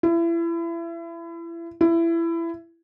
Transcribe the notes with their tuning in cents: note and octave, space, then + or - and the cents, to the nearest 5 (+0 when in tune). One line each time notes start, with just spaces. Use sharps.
E4 +30
E4 +20